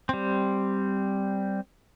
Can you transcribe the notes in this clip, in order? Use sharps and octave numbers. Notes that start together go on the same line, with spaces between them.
G3 C4